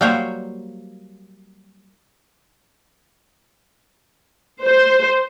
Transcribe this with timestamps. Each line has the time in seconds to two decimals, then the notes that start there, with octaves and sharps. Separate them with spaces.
0.01 F#3 G3 A#3 C5 C#5
4.65 C5